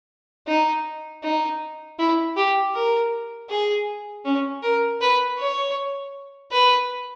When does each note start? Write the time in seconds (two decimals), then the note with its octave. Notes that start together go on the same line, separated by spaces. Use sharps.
0.48 D#4
1.23 D#4
1.99 E4
2.36 G4
2.74 A#4
3.49 G#4
4.25 C#4
4.62 A#4
5.01 B4
5.38 C#5
6.52 B4